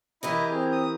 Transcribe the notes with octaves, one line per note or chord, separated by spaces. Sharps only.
E3 E4 G4 A#4 D#5
C4 G#4
D#6